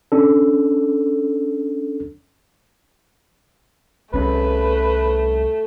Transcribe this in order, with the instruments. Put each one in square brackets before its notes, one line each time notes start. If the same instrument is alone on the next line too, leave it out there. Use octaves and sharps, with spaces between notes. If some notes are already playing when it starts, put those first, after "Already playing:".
[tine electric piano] C#4 D4 A4
[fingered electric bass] C2 C#4 [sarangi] A3 [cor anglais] B4